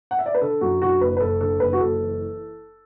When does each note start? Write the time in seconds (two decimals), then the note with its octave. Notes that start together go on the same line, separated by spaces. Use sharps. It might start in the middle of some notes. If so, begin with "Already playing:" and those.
0.11 F#5
0.19 E5
0.26 D5
0.35 B4
0.41 D3 A4
0.61 F#2 F#4
0.81 D3 F#4
1.01 F#1 B4
1.17 B4
1.20 F#1 A4
1.41 D3 A4
1.60 F#1 B4
1.73 F#4
1.80 F#1 A4
2.01 E3